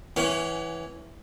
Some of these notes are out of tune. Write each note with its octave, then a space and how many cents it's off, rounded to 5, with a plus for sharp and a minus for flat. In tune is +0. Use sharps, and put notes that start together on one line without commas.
E3 +0 C#4 +0 F#5 +40